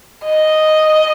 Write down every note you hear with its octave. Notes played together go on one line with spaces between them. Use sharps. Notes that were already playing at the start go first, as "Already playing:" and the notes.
D#5